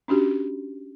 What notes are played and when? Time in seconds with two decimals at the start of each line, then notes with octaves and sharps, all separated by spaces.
0.08 C#4 D4 F#4 G4